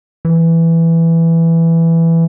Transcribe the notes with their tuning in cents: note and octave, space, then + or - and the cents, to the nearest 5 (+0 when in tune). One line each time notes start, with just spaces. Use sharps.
E3 +5